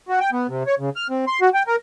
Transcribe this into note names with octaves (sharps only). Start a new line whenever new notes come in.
F#4
G5
B3
C3
C#5
C#3
F6
C4
C6
F#4
G5
A#4